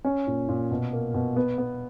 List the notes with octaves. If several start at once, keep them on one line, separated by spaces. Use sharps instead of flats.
C#4 C#5
A#2
A#2
B2
A#3
B2
B3
B3